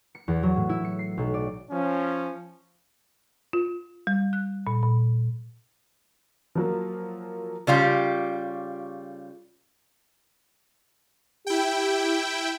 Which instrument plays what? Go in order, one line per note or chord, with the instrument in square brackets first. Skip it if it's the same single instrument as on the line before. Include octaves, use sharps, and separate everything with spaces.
[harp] C#7
E2
F#3
A2
E4
C#7
C7
B1
D5
[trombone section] F3 C#4
[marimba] F4
G3
F#6
A#2
A#2
[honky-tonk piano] F3 F#3 A#3
[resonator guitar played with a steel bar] C#3 G3 F4 G4
[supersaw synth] E4 G5 [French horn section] G4